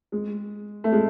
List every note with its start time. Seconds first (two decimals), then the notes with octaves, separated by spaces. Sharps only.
0.12 G#3
0.84 A3
0.93 G#3